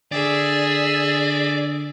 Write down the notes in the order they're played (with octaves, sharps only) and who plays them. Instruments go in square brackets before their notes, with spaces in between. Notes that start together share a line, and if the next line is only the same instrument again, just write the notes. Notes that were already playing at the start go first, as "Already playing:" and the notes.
[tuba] D3 [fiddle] G#4 E5 [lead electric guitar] D5